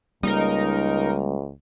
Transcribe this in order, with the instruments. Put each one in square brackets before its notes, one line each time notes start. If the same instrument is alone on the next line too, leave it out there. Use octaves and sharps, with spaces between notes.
[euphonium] C#2 [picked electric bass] G3 A#3 [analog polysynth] D#4 A#4